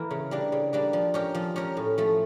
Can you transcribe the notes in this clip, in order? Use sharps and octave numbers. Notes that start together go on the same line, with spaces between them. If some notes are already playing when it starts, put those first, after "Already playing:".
Already playing: E3 A#3 E4 A#4
C#3
G3 A#3 D4
C#3
G3 A#3 D4
F3
C#4 G4 A#4
F3
C#4 G4 A#4
A2
F3 A3